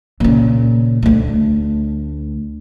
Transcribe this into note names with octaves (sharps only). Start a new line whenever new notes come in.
A#2 C#3
D2 A3